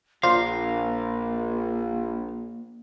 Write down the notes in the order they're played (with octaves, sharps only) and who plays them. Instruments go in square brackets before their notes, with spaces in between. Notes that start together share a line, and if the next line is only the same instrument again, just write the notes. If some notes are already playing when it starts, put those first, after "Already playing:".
[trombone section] A#1 [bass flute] A#3 [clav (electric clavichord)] F4 C5 D5 [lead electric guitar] A#4 F5